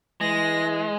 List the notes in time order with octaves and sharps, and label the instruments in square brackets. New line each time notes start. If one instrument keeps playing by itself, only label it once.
[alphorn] E3 [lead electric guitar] G#3 [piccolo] A#6